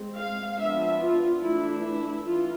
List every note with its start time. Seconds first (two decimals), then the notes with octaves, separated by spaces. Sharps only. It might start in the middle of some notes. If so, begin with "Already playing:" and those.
Already playing: G#3 C4
0.17 F5
0.59 F3 B3 D4 E5
1.01 F4
1.42 E3 A3 D4 E4
1.84 E4
2.25 E3 F4